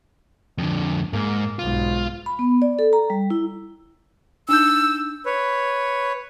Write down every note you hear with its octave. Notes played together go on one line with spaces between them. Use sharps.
F2 D3
G#2 A#3
B1 G#2 F4
B5
B3
D5
A4
A#5
G3
E4
D4 D#4 E6 G6
B4 C#5